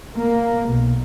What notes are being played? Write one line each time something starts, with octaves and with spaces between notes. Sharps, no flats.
A#3
B1